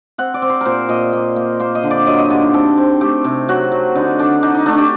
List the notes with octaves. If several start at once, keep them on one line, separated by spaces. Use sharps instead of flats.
C4 F#5
D5
C4
C5
A#2 A#4 C5
A#2 D#5
A#3
A#3
A#3 C5
D#5
D3
D5
F#3 D#5
D#5
D3 G4
D#4
C4 A4
C4
A3 G4
C3
F#3 F#4
F#3
D3 D#4
D3 D4
D4 D#4
D#4
A3 D4
G4